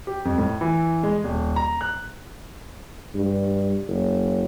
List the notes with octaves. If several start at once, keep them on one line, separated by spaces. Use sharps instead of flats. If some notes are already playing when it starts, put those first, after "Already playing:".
G4
F2
A2
E3
G#3
D#1
A#5
F#6
G2
F#1